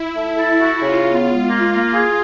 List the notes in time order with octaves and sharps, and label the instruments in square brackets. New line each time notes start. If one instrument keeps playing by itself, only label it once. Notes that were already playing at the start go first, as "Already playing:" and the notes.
Already playing: [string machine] E4
[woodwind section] A3
A4
F#4
[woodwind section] C#3 [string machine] F4
[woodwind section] B3
G#3
A#3
A#3
G#4